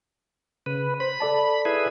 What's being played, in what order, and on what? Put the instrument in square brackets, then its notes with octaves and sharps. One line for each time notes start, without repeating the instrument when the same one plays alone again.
[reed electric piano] C#3 [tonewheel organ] B4
[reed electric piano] C5 [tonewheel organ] B5
[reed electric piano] A4 D5 A5
[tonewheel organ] E4 G#4 B4